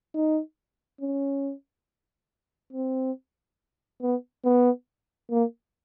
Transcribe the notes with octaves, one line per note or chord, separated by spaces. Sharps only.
D#4
C#4
C4
B3
B3
A#3